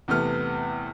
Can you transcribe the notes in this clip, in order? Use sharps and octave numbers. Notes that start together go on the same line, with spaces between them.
E2 C3 A3 B3 F6